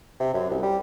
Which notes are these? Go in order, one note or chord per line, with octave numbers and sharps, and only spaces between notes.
C3
F#2
C2
G3